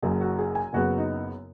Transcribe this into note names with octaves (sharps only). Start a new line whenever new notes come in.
F#1 F#2 C#3 G#4
F#4
G#4
G#5
F#1 F#2 C#3 B3 F#4
D#4